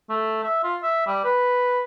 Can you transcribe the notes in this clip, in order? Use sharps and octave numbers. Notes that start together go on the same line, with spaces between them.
A3
E5
F4
E5
G3
B4